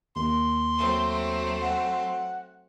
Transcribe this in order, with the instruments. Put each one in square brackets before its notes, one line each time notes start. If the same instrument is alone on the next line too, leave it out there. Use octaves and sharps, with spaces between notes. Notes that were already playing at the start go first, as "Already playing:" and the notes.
[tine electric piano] D#2 [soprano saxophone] C6
[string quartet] F#3 A3 C4
[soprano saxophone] F#5